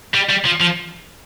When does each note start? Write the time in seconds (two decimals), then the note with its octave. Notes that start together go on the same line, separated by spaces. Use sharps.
0.14 G3
0.30 G3
0.46 F3
0.61 F3